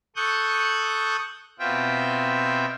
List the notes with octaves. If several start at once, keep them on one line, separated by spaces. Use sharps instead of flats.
A4 C#6 D#6 F#6 G6
B2 C4 F4 E5 G5